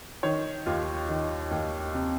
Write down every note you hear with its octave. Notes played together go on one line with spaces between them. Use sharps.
D#3 C#5
D#2 F4
D#3
D#2
C3